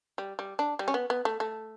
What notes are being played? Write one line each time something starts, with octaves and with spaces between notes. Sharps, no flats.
G3
G3
D4
G3
C#4
B3
B3
A3
A3